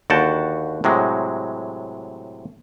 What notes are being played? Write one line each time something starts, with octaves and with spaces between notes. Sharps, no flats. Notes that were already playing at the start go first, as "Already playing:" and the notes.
D#2 D3 F#4 F#5 G5 A5
A2 C3 F#3 G#3